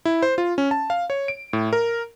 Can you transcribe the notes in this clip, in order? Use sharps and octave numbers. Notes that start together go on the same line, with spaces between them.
E4
C5
F4
C#4
A5
F5
C#5
D7
A2
A#4